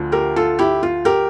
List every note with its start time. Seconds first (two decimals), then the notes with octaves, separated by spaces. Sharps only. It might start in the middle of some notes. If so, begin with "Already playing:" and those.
Already playing: D2 D3 F3
0.12 G4 A#4
0.36 F4 A4
0.59 E4 G4
0.83 F4
1.05 G4 A#4